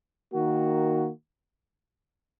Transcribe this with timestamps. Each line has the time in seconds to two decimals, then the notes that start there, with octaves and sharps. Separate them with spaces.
0.32 D#3 A#3 F#4